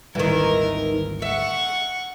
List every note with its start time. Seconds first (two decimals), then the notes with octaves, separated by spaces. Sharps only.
0.15 G#1 D2 D#3 E3 G3 A#4
1.22 E5 F#5 C#6